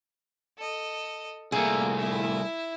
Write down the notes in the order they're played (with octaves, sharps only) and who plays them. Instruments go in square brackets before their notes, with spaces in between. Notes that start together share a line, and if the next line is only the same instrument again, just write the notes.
[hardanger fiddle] A4 D#5
[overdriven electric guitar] C2 A3 [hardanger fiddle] A#3 [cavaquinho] G#4
[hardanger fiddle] E4 E5